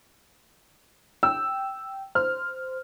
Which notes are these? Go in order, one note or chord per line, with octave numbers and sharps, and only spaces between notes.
G5 E6
C5 F6